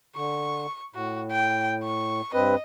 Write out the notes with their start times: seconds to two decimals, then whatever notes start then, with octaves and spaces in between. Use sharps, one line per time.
0.16 D3 C#6
0.95 A2 F#4
1.31 G5
1.84 C#6
2.34 G2 C4 B4 D#5